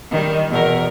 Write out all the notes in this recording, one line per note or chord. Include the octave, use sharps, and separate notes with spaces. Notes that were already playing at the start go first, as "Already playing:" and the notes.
D#3 G3
E2 B2 A#4